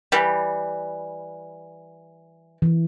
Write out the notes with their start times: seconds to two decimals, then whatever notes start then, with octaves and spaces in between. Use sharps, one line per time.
0.12 E3 G3
2.62 E3